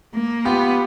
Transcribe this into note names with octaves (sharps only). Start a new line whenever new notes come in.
A#3
B3 F4 G4